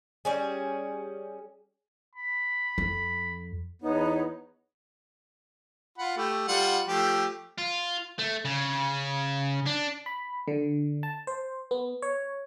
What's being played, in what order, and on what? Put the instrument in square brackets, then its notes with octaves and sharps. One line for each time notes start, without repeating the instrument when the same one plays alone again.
[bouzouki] G3 C#4 G#4
[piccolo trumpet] B5
[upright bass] F2
[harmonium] E2 B3 [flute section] D#4 B4 C#5
[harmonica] F4 F#5 B5
A3 G4
G3 F4 F#5
F3 A3 G4
[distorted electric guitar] F4
A3
C#3
D4
[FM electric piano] B5
D3
A5
C5
B3
C#5